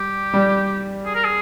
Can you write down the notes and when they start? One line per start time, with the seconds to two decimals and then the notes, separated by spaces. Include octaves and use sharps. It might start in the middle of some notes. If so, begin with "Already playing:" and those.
Already playing: G3 G4
0.33 G3
1.06 G#4
1.15 A#4
1.24 G#4